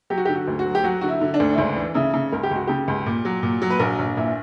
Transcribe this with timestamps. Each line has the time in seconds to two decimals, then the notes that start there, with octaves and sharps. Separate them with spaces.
0.10 F#3 G4
0.18 F#4
0.25 G4
0.29 D3
0.35 F#4
0.48 D2
0.59 F#4
0.66 F#3
0.75 G4
0.83 F#3 F#4
1.01 D3 F#4
1.08 E4
1.21 D3
1.34 D4
1.40 D2
1.53 E4
1.58 C#2 D4
1.76 E3
1.94 C#3 E4
2.14 C#3
2.32 C#2 A#4
2.43 G4
2.51 C#2 F#4
2.67 C#3 G4
2.88 C#2
3.06 A#2
3.25 F#3
3.43 A#2
3.62 F#3
3.70 B4
3.79 A#1 A#4
3.99 A#1
4.17 A#2 E4